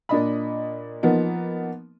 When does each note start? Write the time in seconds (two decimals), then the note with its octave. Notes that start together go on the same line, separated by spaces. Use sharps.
0.09 A#2 D4 D#5 B5
1.03 F3 A#3 B3 D#4